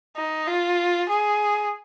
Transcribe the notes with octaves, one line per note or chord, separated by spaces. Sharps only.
D#4
F4
G#4